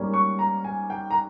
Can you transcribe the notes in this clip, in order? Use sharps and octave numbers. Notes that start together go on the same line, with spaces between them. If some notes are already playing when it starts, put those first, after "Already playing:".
Already playing: G#2 G3 A#3 C#4
C#6
A#5
G#5
G5
A#5